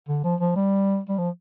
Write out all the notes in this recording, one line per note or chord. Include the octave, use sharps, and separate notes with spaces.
D3
F3
F3
G3
G3
F3